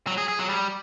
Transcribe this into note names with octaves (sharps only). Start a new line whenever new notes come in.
F#3
G#4
G#4
F#3
G3